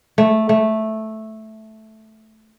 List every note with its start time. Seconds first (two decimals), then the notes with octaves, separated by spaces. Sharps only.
0.18 A3
0.49 A3